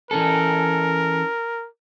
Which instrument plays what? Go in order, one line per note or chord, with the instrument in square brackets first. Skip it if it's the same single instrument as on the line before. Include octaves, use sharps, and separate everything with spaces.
[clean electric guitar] E3 C#4 A4 [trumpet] A#4